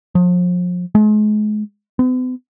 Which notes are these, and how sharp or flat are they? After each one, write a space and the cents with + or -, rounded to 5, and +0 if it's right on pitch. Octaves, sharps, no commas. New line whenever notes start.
F3 +35
G#3 +35
B3 +45